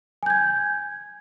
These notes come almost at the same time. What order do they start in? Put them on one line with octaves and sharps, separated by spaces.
G#5 G6 G#6